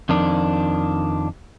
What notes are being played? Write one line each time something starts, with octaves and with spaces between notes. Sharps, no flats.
F2 D#3 D4